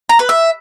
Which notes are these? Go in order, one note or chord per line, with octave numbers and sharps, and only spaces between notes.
A#5
B4
E5